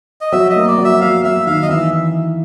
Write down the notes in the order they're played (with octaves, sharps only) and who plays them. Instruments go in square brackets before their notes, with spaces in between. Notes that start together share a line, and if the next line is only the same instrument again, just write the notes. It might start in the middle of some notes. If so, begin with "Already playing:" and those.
[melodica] D#5
[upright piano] F#3 [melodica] E5
[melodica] D#5
[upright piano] A#3
[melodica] D5
[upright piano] F#3
[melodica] E5
[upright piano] F#3 [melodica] F5
[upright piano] F#3 [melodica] E5
[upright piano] D#3 [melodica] F5
[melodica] D#5
[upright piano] E3 [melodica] E5